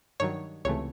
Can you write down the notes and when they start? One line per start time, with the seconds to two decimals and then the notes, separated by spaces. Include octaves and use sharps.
0.20 G2 D#3 F#3 C#5
0.65 C#2 C3 E3 A3 C#5